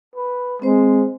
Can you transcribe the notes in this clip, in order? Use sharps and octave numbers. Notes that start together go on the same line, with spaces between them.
B4
G#3 C4 C5